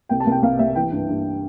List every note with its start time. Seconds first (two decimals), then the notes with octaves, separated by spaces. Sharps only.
0.09 C2 G5
0.20 A5
0.27 C2 G5
0.42 C2 F5
0.59 C2 E5
0.75 E3 G5
0.91 G2
1.08 G2